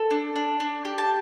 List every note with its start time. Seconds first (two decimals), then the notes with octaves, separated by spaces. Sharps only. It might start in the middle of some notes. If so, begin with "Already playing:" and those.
Already playing: A4
0.10 D4
0.36 D4
0.60 D4
0.85 G4
0.98 A5